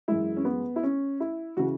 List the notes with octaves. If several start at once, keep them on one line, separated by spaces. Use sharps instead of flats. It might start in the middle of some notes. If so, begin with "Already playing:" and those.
F#2 E3 G#3 E4
C#4
B3
E4
C#4
E4
C#3 E3 F#4